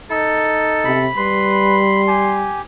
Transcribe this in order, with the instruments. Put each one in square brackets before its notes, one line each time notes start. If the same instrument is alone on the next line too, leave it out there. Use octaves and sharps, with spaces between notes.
[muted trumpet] D#4 [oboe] A4
[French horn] C3 [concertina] B5
[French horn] G3 [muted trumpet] B4 [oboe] C6
[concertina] G4 [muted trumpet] G#5